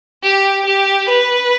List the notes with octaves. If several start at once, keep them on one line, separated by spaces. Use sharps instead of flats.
G4
G4
B4